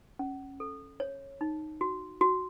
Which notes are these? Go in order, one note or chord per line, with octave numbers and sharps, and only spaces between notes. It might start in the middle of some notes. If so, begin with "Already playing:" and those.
C#4
A4
C#5
D#4
F#4
F#4